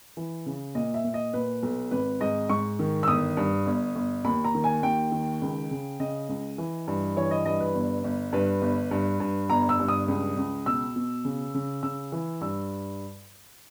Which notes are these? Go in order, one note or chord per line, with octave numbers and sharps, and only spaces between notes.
E3
C#3
A#2 D#5
E5
A#2
D#5
A#2 B4
B1
G#1 B4
G#2 D#5
G#2 C#6
D#3
E6
G1 D#6
G2
G1
G1
D#2 B5
A#5
D#3
G#5
D#2 G5
D#3
C#2
C#3
C#3 D#5
C#2
E3
G2
E3 C#5
D#5
G2 D#5
B4
G1
G1
G2 B4
G1
G2
G2
G1 A#5
E6
G2
D#6
C#2
C#2
B2 E6
B2
C#3
C#3
C#3 E6
E3
G2 E6